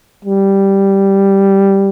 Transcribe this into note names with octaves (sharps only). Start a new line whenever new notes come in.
G3